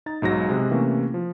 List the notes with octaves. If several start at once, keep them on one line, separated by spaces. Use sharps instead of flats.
D#4 A#5 A6
B1 G#2 F#3 A#6
C3 G#3
C3 E3 A3 A#3 C#4
F3